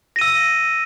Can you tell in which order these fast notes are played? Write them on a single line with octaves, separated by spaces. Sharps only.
A#6 D#7 E6